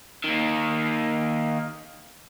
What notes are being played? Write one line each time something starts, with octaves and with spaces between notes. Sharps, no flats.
D#3 A#3